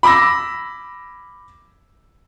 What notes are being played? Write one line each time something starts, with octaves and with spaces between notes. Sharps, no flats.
B5 D6 E6 A#6